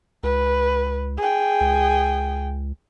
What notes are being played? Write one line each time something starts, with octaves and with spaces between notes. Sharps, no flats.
C#2 B4
G#4 G5
C#2